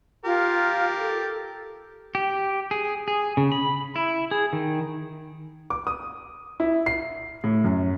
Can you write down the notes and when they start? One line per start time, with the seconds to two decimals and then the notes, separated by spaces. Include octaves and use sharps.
0.25 F4 G4 A#4
0.99 A4
2.15 G4
2.71 G#4
3.08 G#4
3.37 C#3
3.52 B5
3.96 E4
4.31 G#4
4.53 D#3
5.70 D6
5.87 D#6
6.60 E4
6.86 C7
7.44 A2
7.64 F#2